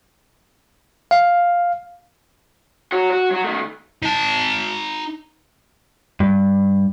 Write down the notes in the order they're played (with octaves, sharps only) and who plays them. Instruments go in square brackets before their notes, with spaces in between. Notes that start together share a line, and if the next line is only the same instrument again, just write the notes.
[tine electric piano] F5
[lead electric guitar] F#4 C#5
F#4
F#3 F#4
D#3 A3
[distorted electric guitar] D#4 A5
[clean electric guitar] G2